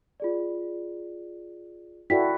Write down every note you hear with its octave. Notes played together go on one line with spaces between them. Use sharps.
F4 G#4 D5
E4 F#4 A4 D5 G5 B6